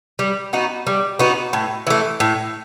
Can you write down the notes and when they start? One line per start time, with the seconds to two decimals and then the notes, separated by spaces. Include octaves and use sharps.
0.19 G3
0.53 B3 D#4 F#4
0.87 G3
1.19 B3 D#4 F#4
1.53 A2
1.87 E3 A3
2.20 A2